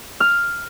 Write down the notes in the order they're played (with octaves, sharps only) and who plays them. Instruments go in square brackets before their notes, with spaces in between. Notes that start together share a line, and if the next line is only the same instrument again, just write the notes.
[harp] F6